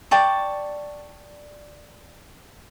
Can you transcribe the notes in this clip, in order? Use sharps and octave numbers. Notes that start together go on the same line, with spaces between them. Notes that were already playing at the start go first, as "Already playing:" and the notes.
D5 G5 A5 C#6